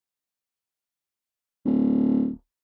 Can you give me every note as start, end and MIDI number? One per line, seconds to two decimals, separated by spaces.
1.65 2.31 26